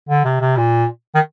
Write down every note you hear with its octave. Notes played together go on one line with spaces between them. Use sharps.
D3
C3
C3
A#2
D#3